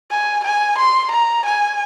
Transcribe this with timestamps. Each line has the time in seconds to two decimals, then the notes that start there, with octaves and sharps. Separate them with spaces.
0.11 G#5
0.44 G#5
0.78 C6
1.11 A#5
1.45 G#5